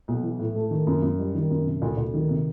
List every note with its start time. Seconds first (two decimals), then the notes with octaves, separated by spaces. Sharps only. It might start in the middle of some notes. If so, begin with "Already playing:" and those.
0.08 B1
0.23 E3
0.40 A2
0.56 A3
0.71 D#3
0.87 F#2
1.02 F#2
1.19 G3
1.35 D#3
1.50 F#2
1.65 C3
1.82 D2
1.97 D2
2.14 D#3
2.29 C3